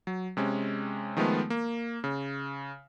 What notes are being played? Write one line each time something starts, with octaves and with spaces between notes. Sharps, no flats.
F#3
C3 G#3 C#4
D#3 F3 G#3 A3 B3
A#3
C#3